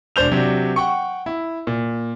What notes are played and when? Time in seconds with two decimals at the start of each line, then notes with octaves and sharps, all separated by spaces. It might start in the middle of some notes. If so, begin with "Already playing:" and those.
0.16 E1 D4 C5 G6 F7
0.31 C3 F#3 D4
0.76 F#5 G5 C#6
1.26 E4
1.67 A#2